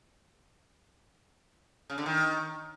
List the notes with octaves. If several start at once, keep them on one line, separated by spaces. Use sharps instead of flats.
C#3
D3
D#3